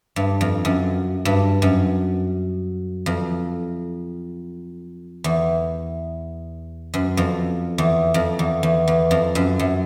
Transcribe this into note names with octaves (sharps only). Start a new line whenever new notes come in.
G2
F2
F#2
G2
F#2
F2
E2
F#2
F2
E2
F2
E2
E2
E2
F2
F#2
F#2